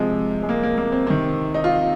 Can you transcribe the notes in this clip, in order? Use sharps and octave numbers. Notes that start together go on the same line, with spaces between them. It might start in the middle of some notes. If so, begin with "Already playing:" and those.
Already playing: C3 F3 G#3
G#3
A#3
A#3
A#3
C4
C3 D#3 C4
D#4
F4